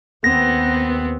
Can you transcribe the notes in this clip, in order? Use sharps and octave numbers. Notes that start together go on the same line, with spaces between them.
D#2 B3 C4 A#6